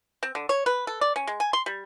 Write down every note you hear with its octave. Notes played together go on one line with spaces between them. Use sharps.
C4
D3
C#5
B4
A4
D5
C#4
G#3
G#5
C6
G3